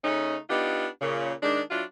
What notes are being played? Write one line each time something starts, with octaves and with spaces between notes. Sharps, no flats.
C#3 A3 C#4 D#4
B3 D4 D#4 F4 G4
A#2 C#3
D#3 G#3 D4
F#3 D4 E4 F4